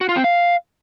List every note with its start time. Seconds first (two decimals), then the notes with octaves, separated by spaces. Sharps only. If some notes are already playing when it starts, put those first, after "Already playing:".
0.01 F#4
0.09 F4
0.16 C4
0.24 F5